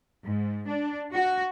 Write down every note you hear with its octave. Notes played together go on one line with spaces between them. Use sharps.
G#2
D4
F#4